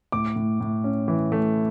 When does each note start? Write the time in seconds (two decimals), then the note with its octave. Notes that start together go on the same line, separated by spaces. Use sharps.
0.12 A2 D6
0.36 A2
0.60 A2
0.84 C#4
1.08 E3
1.32 A3